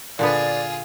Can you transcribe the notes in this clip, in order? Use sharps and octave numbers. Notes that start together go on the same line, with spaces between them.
A#2 D3 B3 F4 G#4 D5